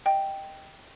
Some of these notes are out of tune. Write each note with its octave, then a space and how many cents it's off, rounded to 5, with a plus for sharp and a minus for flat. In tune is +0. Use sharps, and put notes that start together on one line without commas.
D#5 +0 G5 +0